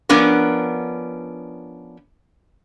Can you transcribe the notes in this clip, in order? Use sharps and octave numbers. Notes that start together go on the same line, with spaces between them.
F3 B3 C#4 D4 A#4